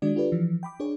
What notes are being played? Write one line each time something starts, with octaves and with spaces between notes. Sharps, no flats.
D#3 G#3 D4 F#4 D5
D4 F4 G4 A4 B4 D5
E3 F3
G5 B5 D6
D4 G#4 C#5